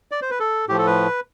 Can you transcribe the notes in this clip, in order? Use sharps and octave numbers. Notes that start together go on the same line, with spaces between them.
D5
C5
B4
A4
A2 F3 G4
A4
B4